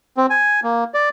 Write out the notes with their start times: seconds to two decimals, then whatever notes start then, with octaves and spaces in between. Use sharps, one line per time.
0.17 C4
0.30 G#5
0.64 A#3
0.94 D5